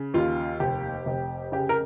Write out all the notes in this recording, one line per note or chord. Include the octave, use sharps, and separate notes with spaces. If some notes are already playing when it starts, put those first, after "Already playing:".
Already playing: C#3
D#2 F4
F1 G4
F1
C#3 G4
A#4